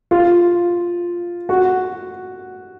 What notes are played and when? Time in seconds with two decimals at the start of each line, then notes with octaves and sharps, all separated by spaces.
0.11 F4
1.49 F#4